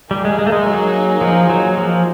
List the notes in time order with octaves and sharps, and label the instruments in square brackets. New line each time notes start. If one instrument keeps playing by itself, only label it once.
[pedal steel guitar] G3 [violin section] A#3 D#4 G#4
[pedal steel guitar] G#3
G#3
A3
G#3
F#3
F3
F#3
F3